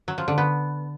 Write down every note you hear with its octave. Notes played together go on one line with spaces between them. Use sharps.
F#3
F3
D3
B3